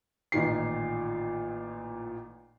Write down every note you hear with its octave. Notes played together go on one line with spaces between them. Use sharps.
A1 A#2 D#3 C7